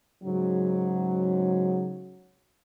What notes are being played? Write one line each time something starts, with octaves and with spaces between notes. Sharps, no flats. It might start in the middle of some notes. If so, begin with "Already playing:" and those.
G#2 C#3 F#3